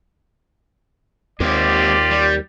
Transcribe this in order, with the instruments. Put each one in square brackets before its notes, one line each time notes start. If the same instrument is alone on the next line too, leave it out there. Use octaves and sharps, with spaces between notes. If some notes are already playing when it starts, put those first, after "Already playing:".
[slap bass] D#2 [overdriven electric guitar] G#3 C4 [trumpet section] F4 G4 D5
[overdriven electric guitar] G3